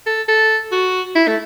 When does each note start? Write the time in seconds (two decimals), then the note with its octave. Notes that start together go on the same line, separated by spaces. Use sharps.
0.06 A4
0.28 A4
0.72 F#4
1.15 E4
1.28 A3